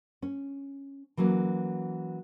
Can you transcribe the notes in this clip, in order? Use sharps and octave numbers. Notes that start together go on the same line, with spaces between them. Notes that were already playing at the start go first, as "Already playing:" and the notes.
C#4
E3 F#3 A#3 C#4